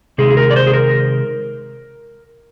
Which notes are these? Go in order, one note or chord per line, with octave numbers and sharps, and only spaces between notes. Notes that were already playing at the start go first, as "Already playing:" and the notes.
C3 D#3 G#3 G#4
G#4
A#4
D5
C5
G#4
A#4